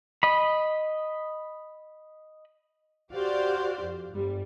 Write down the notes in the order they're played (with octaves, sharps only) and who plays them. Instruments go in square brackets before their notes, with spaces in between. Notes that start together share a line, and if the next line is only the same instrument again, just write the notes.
[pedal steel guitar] D#5 B5
[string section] F#4 G4 C5 D5 F5
F2
G1 G3